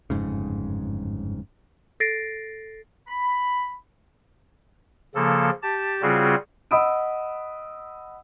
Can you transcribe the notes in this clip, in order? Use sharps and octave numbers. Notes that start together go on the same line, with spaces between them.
G1 F2 G#2 C#3
A4 A6 A#6 C7 D7
B5
C#3 F3 A#3 A4
G4 A5
C#3 G3 C4 F4 F#4 G#4
D#5 F#5 B5 D#6 E6 D7